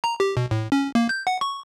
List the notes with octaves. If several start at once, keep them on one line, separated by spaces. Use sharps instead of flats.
A#5
G4
B2
A2
C#4
A#3
G6
F#5
C#6